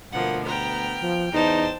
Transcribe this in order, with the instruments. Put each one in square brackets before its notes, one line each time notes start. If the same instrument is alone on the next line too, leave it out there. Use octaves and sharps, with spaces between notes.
[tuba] D2 [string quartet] B2 F3 A#3 [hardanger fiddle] F#5
[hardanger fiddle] B3 A#5 [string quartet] G5 F6
[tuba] F3
[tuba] E2 [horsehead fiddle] D#4 [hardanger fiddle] C5 A5